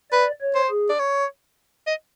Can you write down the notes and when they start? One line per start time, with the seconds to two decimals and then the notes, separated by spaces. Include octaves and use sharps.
0.11 B4 D5
0.41 C#5
0.55 C5
0.70 G#4
0.89 D5
0.99 C#5
1.87 D#5